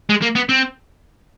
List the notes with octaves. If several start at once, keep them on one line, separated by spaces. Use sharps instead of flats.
G#3
A#3
B3
C4